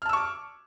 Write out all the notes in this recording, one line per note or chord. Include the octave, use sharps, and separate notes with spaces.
A5 C#6 D6 E6 F6